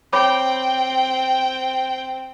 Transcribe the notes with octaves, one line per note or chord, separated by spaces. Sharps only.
C4 C#5 G5 B5 D6